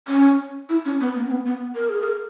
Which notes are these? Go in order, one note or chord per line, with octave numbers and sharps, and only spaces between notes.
C#4
E4
C#4
B3
A#3
C#4
B3
B3
A#4
G#4
A#4